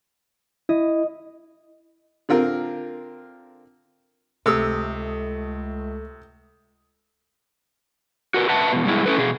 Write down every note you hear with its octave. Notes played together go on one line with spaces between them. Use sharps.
E4 D#5
D3 C4 F4 A#4
C#2 C3 A3 D#6 E6
F#4 A#4 B4
B4 E5 F#5 A5
E2 B2
G2 B2 G#3 E4
C#4 E4 A4 B4
B2 G#4